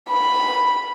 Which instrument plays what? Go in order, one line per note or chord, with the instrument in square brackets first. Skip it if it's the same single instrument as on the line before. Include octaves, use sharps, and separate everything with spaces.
[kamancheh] B5